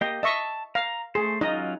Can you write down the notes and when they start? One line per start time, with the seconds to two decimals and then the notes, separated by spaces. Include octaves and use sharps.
0.01 A#3 G4 D#5
0.23 D#5 E5 A5 C#6
0.75 F5 A#5
1.15 A3 G#4 C5
1.41 F#3 C#4 D#4 F4 D#5